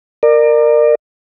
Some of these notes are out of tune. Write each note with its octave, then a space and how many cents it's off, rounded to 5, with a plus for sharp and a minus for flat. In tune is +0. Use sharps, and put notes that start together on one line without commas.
A#4 -10 D5 +30